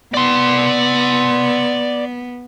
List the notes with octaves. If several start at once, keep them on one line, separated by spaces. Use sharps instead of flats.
B3 D5 C6